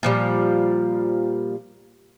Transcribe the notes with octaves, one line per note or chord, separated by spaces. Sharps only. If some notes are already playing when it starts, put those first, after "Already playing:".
A#2 F3 G3